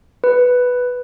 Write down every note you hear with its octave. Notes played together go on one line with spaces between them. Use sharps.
B4